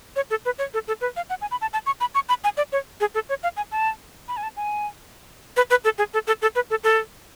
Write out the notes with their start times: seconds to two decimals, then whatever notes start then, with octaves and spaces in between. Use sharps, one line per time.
0.16 C#5
0.30 A4
0.45 B4
0.58 C#5
0.74 A4
0.88 A4
1.01 B4
1.16 F5
1.30 F#5
1.41 G#5
1.51 B5
1.61 A5
1.73 A5
1.86 C#6
2.00 B5
2.15 C#6
2.29 B5
2.44 G#5
2.57 D5
2.72 C#5
3.01 G#4
3.15 A4
3.29 C#5
3.43 F5
3.57 G#5
3.72 A5
4.28 B5
4.37 G#5
4.43 A5
4.57 G#5
5.57 B4
5.70 B4
5.84 A4
5.98 G#4
6.14 A4
6.27 A4
6.42 A4
6.55 B4
6.70 A4
6.84 A4